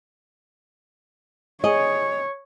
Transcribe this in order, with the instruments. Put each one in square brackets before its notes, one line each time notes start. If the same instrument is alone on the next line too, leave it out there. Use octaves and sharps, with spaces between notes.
[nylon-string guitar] G#4 D#5 [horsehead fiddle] C#5